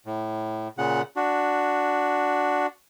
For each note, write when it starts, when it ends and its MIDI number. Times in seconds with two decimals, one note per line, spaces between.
0.06 0.68 45
0.78 1.02 46
0.78 1.02 49
0.78 1.02 78
1.16 2.67 62
1.16 2.67 66